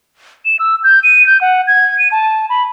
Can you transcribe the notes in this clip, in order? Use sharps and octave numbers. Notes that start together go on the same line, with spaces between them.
E7
E6
G6
D#7
G6
F#5
G#6
D#7
A5
B5